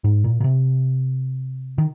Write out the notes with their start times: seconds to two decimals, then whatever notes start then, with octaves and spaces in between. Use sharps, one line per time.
0.04 G#2
0.24 A#2
0.41 A#2
0.44 C3
1.78 D#3